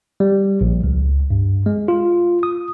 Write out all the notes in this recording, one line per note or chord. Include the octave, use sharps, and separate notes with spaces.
G3
A#1
C#2
G2
G#3
F4
D#6